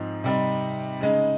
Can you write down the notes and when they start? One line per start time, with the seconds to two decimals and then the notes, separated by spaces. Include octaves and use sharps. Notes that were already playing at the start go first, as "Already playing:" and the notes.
Already playing: G#2 F3 C4 D#4
0.24 C3 G3 C4 D#4
1.01 C#3 G#3 D#4